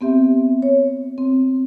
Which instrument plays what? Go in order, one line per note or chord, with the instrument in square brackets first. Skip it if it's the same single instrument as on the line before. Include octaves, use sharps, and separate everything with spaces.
[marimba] B3 C4 G4 E5
C#5
C4